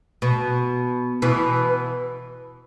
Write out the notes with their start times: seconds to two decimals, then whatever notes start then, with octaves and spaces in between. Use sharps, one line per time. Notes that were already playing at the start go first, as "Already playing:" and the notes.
0.22 B2
1.22 B2 E3